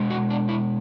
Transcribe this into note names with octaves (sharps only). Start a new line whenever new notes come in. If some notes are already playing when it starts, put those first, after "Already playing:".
Already playing: B2 G#3
F#4
D4
E4